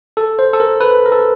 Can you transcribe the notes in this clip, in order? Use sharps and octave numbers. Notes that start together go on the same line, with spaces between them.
A4
C5
A4
A#4
B4
A#4
A4